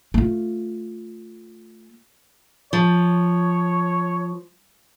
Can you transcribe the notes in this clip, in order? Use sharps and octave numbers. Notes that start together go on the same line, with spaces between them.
A3 F4
F3 C#5